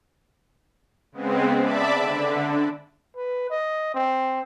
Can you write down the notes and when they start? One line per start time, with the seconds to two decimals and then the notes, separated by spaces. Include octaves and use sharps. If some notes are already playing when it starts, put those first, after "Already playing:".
1.12 C#3 G#3 B3 C4
1.59 D5 E5 A5 B5 D6
1.99 D3
3.16 B4
3.50 D#5
3.94 C4